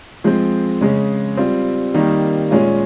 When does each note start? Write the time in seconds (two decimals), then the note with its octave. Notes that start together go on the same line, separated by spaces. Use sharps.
0.24 F3 G#3 C4
0.81 C#3 G#3 C#4
1.37 G3 C4 F4
1.94 D#3 G3 A#3 D#4
2.51 A#2 G#3 C#4 F4